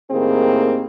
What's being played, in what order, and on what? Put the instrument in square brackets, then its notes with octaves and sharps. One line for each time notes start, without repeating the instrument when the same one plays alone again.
[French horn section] A2 D#3 A#3 C4 G4 G#4